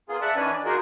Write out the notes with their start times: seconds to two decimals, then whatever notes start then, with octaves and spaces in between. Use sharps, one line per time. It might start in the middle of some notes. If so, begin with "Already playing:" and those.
0.09 A#3 B3 F4 G#4
0.21 D5 E5 F#5 A5
0.36 D#3 E3 C#4 D4 B4 G#5
0.53 D5
0.65 A#3 D#4 F4 F#4 G#4 A#4